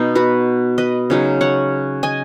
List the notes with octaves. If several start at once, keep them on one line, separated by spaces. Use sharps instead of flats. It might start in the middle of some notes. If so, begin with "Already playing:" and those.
Already playing: B2 B3 D#4
F#4 B4
B4 D#5
C#3 F#3 D#4
C#5 F#5
D#5 G#5